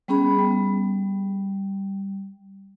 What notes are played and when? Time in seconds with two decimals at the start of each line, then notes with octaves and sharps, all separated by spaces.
0.08 G3 B3 C#4 G#4 B5
0.39 G3